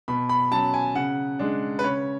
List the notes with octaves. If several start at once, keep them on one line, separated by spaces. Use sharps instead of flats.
B2 B5
B5
F#3 C#4 A5
G#5
C#3 F#5
G#3 D4
B4
C#3 C#5